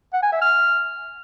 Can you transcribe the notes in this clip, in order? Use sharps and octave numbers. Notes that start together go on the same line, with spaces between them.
F#5
G#5
E5
F6